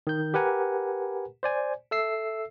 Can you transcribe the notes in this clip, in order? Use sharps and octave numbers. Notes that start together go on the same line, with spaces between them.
D#3 G6
G4 A#4 B4 F#5 G#5 A#5
C5 D5 G#5
A4 E5 E6 C7